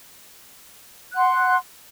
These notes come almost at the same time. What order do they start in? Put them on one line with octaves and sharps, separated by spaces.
F#6 F#5 C6